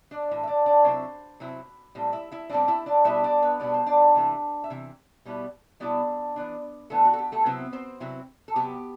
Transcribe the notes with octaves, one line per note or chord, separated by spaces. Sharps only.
D4 D5
A2 E3
E5
D4 D5
D4 D5
C3 F#3 C4 E4 C5
C3 F#3 C4 E4
A2 G3 C4
E4 E5
E4 E5
A2 G3 C4 D4 D5
E4 E5
D4 D5
B2 G3 B3 D4 E4 E5
D4 D5
B3 B4
B2 G3 B3 D4 D5
C5
D4 D5
C3 E3 A3
E5
C3 E3
B2 G3 B3 E4
B2 G3 B3 D4 E4 D5
E3 B3 D4
E3 A3 B3 D4 A4
F#4
A4
G4
A3 A4
C3 F#3 B3 C4 E4 B4
C4 C5
C3 F#3 C4 E4
A4
C3 F#3 B3 G4